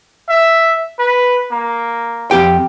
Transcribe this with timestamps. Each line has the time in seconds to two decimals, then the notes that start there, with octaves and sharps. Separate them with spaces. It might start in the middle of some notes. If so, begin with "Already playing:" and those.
0.28 E5
0.99 B4
1.51 A#3
2.31 F2 G4 G5